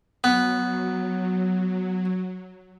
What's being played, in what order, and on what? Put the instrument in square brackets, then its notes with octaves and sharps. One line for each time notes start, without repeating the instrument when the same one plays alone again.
[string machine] F#3 [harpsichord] B3